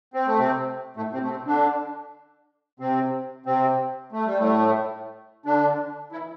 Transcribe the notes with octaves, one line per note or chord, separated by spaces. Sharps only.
C4
A3
C3 C4
A2 A3
C3 C4
A3
C3 C4
D3 D4
C3 C4
C3 C4
A3
G3
A2 A3
D3 D4
E3 E4